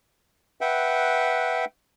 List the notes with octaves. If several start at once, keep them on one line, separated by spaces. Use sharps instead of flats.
B4 E5 F#5 G5